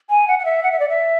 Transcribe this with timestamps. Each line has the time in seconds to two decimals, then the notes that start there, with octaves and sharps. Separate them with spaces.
0.10 G#5
0.28 F#5
0.39 F#5
0.45 E5
0.63 F#5
0.72 E5
0.80 D5
0.89 E5